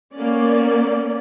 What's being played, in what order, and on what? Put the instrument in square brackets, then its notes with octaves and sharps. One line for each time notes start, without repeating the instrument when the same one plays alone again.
[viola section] A#3 B3 C#4 D5